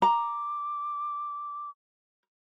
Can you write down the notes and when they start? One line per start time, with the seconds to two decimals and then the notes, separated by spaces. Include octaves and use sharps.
0.02 A#5 D6